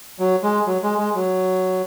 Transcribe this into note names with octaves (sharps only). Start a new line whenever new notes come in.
F#3
G#3
F#3
G#3
G#3
F#3